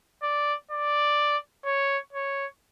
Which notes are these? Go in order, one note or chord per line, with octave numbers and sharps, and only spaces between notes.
D5
D5
C#5
C#5